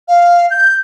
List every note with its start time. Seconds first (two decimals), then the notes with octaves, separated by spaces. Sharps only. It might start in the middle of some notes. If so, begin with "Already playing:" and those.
0.08 F5
0.50 G6